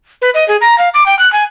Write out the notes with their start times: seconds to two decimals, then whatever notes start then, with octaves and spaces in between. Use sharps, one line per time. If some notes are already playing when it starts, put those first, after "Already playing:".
0.22 B4
0.34 D#5
0.48 G#4
0.61 A#5
0.78 F5
0.94 D6
1.06 G5
1.19 F#6
1.33 G#5